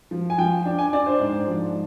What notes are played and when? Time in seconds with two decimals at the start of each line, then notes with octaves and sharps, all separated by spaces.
0.11 F3
0.30 G#5
0.38 F3 G5
0.65 D4
0.79 G#5
0.93 D4 D5
1.06 C5
1.20 G#2
1.47 F3